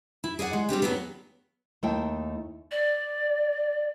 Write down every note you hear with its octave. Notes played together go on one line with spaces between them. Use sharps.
E4
G#4 D5 D#5 F#5
G#3
G3 C4 D4 G4
C#3 F#3 A3 B3
D#2 A3 D#4 E4 D#5 G5
D5